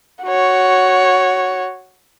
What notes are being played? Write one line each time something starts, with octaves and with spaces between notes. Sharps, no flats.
F#4 C#5